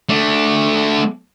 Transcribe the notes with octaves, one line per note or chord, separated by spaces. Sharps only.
A3 D4